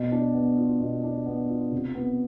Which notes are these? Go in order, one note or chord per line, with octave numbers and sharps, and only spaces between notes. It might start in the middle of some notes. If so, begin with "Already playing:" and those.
Already playing: B2
D4
B3
F4
B2
D4
B3
F4
C3
B3